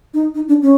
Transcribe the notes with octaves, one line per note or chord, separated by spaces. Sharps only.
D#4
D#4
D4
C#4